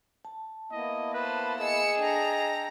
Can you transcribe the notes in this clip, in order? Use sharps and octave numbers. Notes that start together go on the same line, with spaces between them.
A5
A#3 B3 E4 D#5
A4 B4 C5
G#4 D#5 E6 C#7
D4 A4 G5 A5 A#5